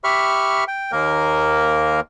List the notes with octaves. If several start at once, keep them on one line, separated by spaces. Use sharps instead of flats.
G4 E5 B5 C#6 F6
G5
D#2 A#3 A#4